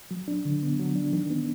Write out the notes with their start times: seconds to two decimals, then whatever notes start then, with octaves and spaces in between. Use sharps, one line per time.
0.11 F#3
0.28 D4
0.45 D3
0.62 B3
0.80 F#3
0.96 D4
1.13 D#3
1.30 B3